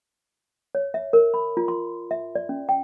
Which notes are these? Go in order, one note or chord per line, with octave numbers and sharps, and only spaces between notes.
C#5
E5
A#4
B5
F4
C6
E5
D5
C#4
G5